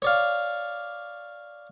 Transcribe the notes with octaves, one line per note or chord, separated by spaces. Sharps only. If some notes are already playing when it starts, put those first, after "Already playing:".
C#5 D5 F5